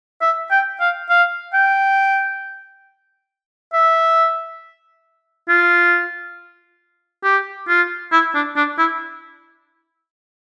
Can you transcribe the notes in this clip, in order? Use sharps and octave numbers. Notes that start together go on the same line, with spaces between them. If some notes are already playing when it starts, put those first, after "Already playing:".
E5
G5
F5
F5
G5
E5
F4
G4
F4
E4
D4
D4
E4